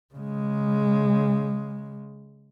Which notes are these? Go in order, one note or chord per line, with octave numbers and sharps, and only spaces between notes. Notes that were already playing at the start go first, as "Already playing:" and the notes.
C#3 G#3